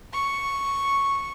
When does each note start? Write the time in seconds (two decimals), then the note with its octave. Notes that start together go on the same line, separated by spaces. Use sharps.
0.13 C#6